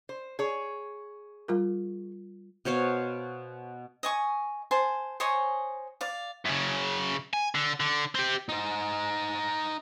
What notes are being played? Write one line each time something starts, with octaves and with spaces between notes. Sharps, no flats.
C5
G#4 C#5
G3 F4 A#4
B2 C5 C#5 F5
D#5 G#5 C#6
C5 G#5 A5
C5 C#5 D#5 G#5
D5 F5
F#2 C#3
G#5
D3
D3
C4 G4
D#4 C5